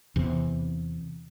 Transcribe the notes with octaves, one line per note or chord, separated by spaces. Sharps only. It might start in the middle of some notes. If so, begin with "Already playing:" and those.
E2 C3